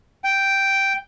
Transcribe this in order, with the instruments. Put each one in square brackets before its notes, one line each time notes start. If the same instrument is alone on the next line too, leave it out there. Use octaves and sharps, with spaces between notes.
[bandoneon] G5